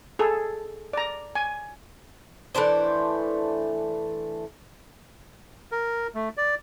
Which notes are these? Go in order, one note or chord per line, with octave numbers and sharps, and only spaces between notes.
G#4 A4
D5 A#5
G#5
E3 A3 D4 C5
A#4
A3
D5